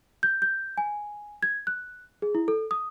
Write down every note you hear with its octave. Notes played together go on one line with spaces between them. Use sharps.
G6
G6
G#5
G#6
F#6
G#4
E4
A4
D#6